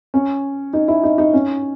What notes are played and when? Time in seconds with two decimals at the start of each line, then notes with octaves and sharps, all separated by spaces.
0.14 C#4
0.73 D#4
0.88 E4
1.03 D#4
1.18 D#4
1.33 C#4